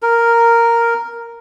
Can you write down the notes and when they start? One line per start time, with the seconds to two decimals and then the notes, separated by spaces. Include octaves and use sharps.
0.02 A#4